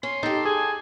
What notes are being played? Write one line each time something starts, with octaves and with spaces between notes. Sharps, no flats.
C#4 C6
D#4 G4 A4
G#4 G#5